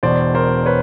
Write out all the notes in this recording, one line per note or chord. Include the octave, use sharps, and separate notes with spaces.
E1 E2 B2 C5 D5
A#4 C5
B4 C#5